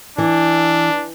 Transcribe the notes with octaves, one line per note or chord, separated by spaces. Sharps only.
E3 D4